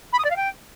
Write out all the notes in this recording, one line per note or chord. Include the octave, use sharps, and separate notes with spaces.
B5
D#6
D5
F5
G5